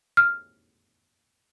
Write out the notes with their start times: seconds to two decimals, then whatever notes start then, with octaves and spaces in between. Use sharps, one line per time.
0.17 F6